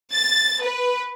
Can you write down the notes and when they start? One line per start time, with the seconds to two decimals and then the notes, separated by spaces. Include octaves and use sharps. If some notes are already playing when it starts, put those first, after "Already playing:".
0.12 A6
0.63 B4